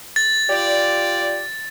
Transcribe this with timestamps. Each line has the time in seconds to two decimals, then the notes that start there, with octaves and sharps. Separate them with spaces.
0.16 A6
0.50 F4 G4 D5